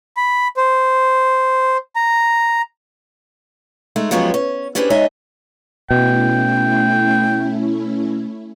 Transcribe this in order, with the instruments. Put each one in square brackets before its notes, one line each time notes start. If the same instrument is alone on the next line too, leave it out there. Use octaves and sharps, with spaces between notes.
[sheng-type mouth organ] B5
C5
A#5
[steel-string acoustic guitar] G#3 A3 D#4
F3 F#3 G#3 B3 C#4 G4
C#4
C#4 D4 G4 G#4 B4 C5
G#3 D#4 C#5 D#5 E5 G#5
[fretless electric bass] B2 [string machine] A3 C#4 E4 [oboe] G5